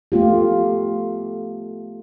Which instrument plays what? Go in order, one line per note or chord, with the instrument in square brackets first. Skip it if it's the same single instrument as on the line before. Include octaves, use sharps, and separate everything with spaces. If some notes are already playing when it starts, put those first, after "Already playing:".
[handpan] A3 B3 F4 G4